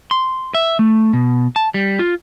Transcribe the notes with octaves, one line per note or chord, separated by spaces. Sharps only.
C6
E5
A3
B2
A5
G3
F4